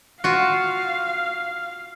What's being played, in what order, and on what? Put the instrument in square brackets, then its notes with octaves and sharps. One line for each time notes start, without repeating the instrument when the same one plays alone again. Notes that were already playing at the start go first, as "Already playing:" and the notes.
[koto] F4 F#4 [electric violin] F5